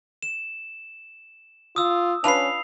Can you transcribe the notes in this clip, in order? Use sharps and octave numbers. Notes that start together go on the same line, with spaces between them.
E7
F4 D#6 E6
C#4 D4 F4 B4 C7 F7